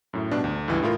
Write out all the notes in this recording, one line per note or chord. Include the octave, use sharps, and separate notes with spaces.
F#2 A2
G2 B2 D4
D2
C#2 G2 E3
A2 E4 F4 A#4